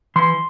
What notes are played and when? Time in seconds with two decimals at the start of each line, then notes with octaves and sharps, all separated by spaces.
0.16 E3 C6